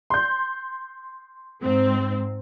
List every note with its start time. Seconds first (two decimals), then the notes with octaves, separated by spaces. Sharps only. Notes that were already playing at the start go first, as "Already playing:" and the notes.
0.10 C6 G6
1.63 G#2 C4